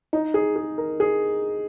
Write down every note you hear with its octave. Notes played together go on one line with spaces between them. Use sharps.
D#4
G#4
G#4
A#4
G#4